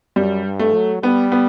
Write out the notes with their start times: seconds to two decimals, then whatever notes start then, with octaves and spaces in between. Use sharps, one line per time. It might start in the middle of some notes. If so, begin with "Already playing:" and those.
0.16 F#2 G3
0.45 G2
0.60 A3
0.74 F#3
1.03 G3 B3
1.32 B3